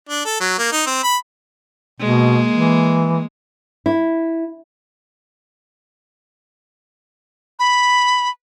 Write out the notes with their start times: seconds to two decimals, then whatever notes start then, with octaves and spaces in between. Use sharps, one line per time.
0.09 D4
0.25 A4
0.40 F#3
0.58 A#3
0.72 D#4
0.86 C4
1.03 B5
2.00 B2 G#3 A#3
2.53 E3
3.86 E4
7.59 B5